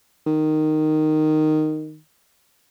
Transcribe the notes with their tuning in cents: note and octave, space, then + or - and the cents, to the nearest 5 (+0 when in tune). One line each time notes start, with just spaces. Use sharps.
D#3 -10